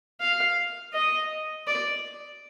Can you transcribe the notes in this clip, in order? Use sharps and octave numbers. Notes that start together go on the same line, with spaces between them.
F5
D#5
D5